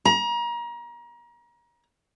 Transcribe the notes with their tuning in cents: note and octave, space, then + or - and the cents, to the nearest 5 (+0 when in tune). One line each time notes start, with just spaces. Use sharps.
A#5 +30